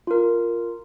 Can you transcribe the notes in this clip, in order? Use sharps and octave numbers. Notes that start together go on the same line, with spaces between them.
F4 A#4